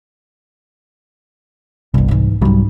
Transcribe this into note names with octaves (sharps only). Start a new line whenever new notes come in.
G1 C2 E3
G#2 E3
C2 G#2 F#3 G3 C#4